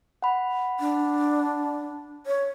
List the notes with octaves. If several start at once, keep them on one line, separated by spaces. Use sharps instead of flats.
F#5 B5
D4
C#5